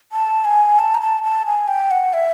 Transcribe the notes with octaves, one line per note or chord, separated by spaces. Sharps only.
A5
G#5
A5
A#5
A5
A5
G#5
G5
F#5
E5